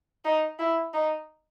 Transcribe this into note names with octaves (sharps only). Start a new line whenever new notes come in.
D#4
E4
D#4